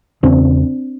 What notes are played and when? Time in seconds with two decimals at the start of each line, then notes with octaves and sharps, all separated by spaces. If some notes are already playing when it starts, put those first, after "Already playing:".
0.23 E2 C#3 C4 D4